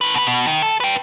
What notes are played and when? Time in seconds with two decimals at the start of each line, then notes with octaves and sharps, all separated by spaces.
0.01 D#3 B4
0.14 B2 B4
0.27 B2
0.47 D#3
0.62 A4
0.80 B4 G5